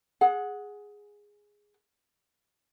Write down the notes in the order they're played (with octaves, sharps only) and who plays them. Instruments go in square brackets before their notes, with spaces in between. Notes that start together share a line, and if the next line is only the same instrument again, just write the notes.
[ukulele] G#4 F#5